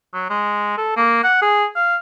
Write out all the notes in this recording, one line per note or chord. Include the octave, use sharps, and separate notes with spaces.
F#3
G#3
A4
A#3
F#5
G#4
F5